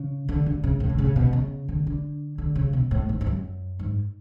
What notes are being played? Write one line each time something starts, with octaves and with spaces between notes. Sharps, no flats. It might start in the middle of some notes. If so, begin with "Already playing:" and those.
Already playing: C#3
D3
D3
C#3
A2
D3
C#3
B2
C#3
D3
D3
D3
C#3
B2
A2
G#2
F2
F#2
G#2